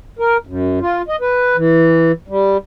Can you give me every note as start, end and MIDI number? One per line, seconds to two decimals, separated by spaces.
0.19 0.37 70
0.47 0.79 42
0.81 1.02 65
1.08 1.16 75
1.21 1.56 71
1.57 2.12 52
2.28 2.57 55